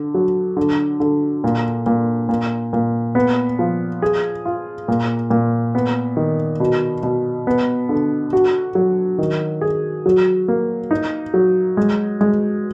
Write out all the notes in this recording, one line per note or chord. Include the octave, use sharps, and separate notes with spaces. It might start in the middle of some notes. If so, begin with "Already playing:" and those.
Already playing: D3
F#3
D3
D3
A#2
A#2
A#2
A#2
B3
F3
G#4
F4
A#2
A#2
B3
D#3
B2
B2
B3
D3
F#4
F#3
D#3
G#4
F#3
A#3
D#4
F#3
G#3
G#3